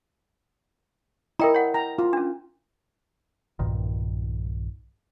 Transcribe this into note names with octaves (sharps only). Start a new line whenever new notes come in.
E4 A#4 D#5 G5 A#5
C#5 F#5
G5 A#5
F4
C#4 D4
B1 G2 A#2 D#3